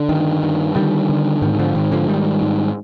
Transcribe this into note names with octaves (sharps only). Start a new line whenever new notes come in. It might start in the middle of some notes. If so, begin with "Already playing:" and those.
Already playing: D3
G2 D#3
G2
D3 D#3 G3
D3
G#2 D#3
D3 F3
G#2 D#3
D3 F3
G#2 D#3 G3
G#2